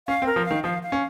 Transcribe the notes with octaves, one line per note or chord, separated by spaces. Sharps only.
C#4 F5
C4
A#4
F3
F5
D#3
F3 F5
F5
C#4